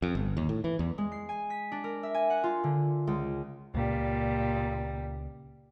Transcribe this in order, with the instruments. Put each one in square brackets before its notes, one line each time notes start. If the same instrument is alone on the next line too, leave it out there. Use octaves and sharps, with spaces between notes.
[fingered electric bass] F2
G1
D#2
A2
E3
E2
[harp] G#3
C7
G#5
B6
D4
A#4
E5
G#5
F#5
F4
D3
C#2
[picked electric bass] C#2 [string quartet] A#2 G3